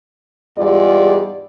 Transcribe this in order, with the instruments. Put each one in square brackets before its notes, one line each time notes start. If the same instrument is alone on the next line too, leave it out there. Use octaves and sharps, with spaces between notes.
[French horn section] E2 G#2 G3 F4 D5